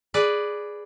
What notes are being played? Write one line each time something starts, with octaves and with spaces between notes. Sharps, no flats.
G#4 B4 D5